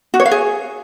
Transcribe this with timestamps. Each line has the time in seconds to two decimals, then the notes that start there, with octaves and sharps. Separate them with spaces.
0.14 F#4
0.20 C#5
0.26 F5
0.31 G#4